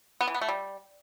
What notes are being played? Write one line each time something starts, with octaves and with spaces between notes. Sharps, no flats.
B3
E3
B3
A3
G3